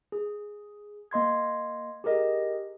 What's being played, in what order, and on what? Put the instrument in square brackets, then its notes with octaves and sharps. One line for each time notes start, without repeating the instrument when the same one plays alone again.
[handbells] G#4
A#3 D#5 C6 G#6
G4 G#4 A#4 D#5